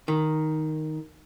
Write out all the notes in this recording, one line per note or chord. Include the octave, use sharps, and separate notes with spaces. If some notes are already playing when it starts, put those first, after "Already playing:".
D#3